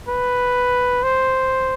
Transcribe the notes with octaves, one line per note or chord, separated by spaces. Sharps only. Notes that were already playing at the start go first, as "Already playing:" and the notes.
B4
C5